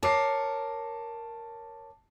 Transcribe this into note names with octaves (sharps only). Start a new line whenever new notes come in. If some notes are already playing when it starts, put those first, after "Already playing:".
A#4 C#5 A5 D6 C7